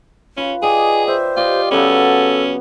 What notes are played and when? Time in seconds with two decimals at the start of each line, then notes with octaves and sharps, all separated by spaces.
0.37 C#4 F4 B4
0.62 G#4 D5 D#5 G5 G#5
1.07 C5 E5
1.37 F4 G4 D5 D#5
1.71 C#3 F#3 B3 C#4 A4